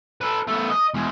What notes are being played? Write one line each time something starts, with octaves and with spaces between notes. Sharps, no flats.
A4 B4
A3 B3
D#5
E2 G#3